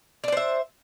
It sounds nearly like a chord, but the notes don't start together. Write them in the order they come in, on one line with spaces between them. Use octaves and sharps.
D4 D5 C5 E5